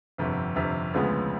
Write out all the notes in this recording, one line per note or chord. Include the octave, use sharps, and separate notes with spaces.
G1 F2 C3
G1 F2 C3
D2 C#3 F3 G#3 B3